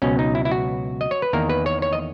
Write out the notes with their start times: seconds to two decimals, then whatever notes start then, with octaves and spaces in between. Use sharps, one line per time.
0.02 C#2 B2 F#3 C#4
0.19 D#4
0.35 E4
0.45 E4
0.51 F#4
1.01 D#5
1.11 C#5
1.22 B4
1.33 E2 D#3 A#3 A#4
1.49 B4
1.66 C#5
1.82 C#5
1.93 D#5